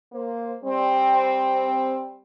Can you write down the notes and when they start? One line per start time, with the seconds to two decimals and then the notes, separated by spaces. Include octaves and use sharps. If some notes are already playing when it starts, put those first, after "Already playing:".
0.13 A#3 C5
0.64 G3 C4